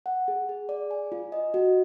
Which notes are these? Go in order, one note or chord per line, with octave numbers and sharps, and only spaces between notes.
F#5
G#4
G#4
D5
G#5
F4
D#5
F#4